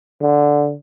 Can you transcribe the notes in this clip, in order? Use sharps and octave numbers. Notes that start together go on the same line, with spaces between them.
D3